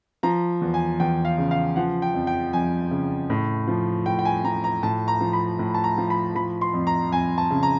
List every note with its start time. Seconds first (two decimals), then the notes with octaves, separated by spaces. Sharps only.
0.23 F3 A#5
0.62 E2
0.74 G#5
1.00 E2 G5
1.25 F5
1.38 C#3
1.51 F5
1.76 F3 F#5
2.02 G5
2.14 F2
2.27 G5
2.53 F2 G#5
2.91 C#3
3.30 A2
3.68 F3
4.06 A2 G5
4.19 G5
4.25 G#5
4.44 F3 A#5
4.64 A#5
4.83 A2 A5
5.08 A#5
5.21 F3
5.33 B5
5.59 A2
5.74 A5
5.84 A#5
5.98 F3
6.10 B5
6.35 F3 B5
6.61 C6
6.74 F2
6.87 A#5
7.12 F2 G#5
7.38 A5
7.50 C#3
7.63 A#5